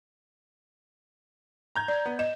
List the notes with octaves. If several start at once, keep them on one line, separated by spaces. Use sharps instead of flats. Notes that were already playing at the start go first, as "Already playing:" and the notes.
A#5 G6 G#6
D5
B3
D#5 E7